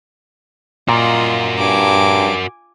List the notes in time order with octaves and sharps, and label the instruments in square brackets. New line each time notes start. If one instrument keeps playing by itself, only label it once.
[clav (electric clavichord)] A#2 [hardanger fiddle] F4 D#5 [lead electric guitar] F#4 A#4
[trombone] G2 [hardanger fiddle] G#5 D6